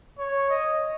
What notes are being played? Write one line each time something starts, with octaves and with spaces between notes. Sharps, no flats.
C#5
D#5